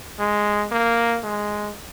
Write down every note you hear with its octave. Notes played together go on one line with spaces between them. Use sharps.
G#3
A#3
G#3